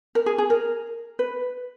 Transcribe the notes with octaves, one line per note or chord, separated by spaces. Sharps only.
A#4
G#4
G#4
A#4
B4